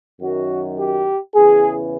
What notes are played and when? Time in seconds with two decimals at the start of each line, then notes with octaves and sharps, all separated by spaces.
0.20 F#2 D#3 F#3 F#4
0.77 G4
1.34 E2 C#3 E3 G#4